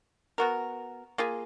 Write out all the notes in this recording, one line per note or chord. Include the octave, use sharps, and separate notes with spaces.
B3 F#4 A#4
A#3 F4 G#4